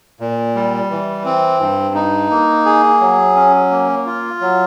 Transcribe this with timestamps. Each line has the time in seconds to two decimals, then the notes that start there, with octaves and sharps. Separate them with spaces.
0.20 A#2
0.55 G3
0.90 E3
1.25 C4
1.60 G2
1.95 D#4
2.30 A#3
2.66 G#4
3.01 F#3
3.36 C#4
3.71 A#3
4.06 F4
4.41 F#3